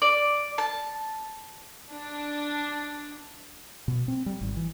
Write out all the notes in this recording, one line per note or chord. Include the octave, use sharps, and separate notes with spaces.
D5
A5
D4
B2
C4
G3
G#1
E3